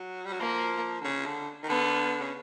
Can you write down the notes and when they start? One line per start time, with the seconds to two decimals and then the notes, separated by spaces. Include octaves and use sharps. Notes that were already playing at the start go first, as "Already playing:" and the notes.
Already playing: F#3
0.26 G3
0.32 F#3
0.40 F3 A#3
1.01 D3
1.04 C#3
1.26 D3
1.63 D#3
1.68 D3 B3
2.21 C#3